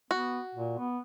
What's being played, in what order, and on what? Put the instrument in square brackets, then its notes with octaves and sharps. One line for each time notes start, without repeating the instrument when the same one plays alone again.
[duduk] B3 [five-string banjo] F#4
[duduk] A#2
B3